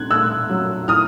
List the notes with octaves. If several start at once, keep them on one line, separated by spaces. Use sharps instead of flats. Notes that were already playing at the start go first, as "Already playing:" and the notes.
Already playing: C4 F#6 G#6
A3 E6 F#6
F#3
A2 D#6 F6